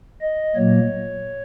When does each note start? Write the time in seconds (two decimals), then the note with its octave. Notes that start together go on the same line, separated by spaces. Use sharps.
0.22 D#5
0.56 A#2 F#3 A#3 C#5